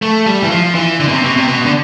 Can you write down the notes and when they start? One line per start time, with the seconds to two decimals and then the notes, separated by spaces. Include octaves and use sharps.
0.02 A3
0.26 G3
0.43 E3
0.51 F3
0.75 E3
1.00 D3
1.08 B2
1.12 C3
1.24 B2
1.36 C3
1.48 B2
1.66 D3